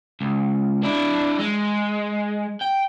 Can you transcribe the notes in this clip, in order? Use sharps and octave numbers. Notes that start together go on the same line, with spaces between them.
C#2
D4 E4
G#3
G5